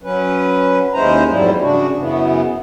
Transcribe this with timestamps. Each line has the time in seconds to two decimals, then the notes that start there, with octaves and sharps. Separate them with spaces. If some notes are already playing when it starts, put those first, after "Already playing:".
0.03 F#3 C#4 B4
0.94 D#2 G#3 C#4 E4 C5 A#5
1.29 F2 G#2 F#3 G3 E4
1.61 C#3 D4 F#4
1.98 F#2 C#3 E3 B3